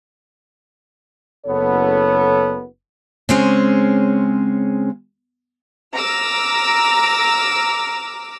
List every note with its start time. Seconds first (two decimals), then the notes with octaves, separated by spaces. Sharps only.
1.46 F#1 B3 A4 C#5
3.29 C#3 G#3 C4 C#4
5.94 A#5 D6 E6 F6